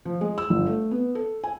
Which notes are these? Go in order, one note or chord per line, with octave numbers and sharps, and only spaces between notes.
F3
G#3
E6
G1
A3
B3
A4
G#5